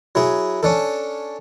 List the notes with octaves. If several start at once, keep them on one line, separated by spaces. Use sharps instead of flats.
F#3 E4 G#4
C#4 D4 A4